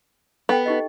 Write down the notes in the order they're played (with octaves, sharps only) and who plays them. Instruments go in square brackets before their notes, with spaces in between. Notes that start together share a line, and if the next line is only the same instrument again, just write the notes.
[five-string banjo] B3 [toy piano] A4 G5
[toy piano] D#4 G4 D#5